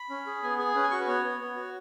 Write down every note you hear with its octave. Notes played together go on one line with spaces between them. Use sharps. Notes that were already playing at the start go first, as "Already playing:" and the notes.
Already playing: B5
C#4
G#4
B3 G#5
G#4 G#5
C#4 B4
G#5
F#4 C#6
B4
B3 C#5
B3
B3
F#4